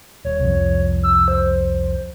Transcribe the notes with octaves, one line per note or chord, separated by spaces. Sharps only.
D#1 C#5
C2 F2
E6
C5